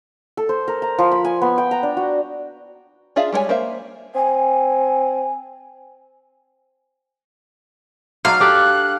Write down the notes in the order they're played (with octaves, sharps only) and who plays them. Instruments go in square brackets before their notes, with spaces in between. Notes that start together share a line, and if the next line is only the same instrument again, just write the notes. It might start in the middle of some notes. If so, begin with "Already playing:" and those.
[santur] A4
C5
A#4
A#5
F3
B5
G#5
B3
G5
A#5
D4
F#4
[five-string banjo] D4 F4 G#4 E5 F5
G3 G#3 D4 C#5 G#5
A#3 C5 E5 F5
[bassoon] C4 [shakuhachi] G#5
[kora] F#3 D4 D#4 [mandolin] F5
[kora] D4 G4 A4 [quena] F#6